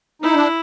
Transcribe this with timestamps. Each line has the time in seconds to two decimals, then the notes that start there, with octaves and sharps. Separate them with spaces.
0.22 D#4 E4
0.35 D4